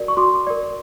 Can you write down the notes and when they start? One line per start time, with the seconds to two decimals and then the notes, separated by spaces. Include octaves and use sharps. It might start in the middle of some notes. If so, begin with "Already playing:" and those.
Already playing: F#4 A#4 D5
0.08 C#6
0.17 F#4 C6 D6
0.47 A#4 D5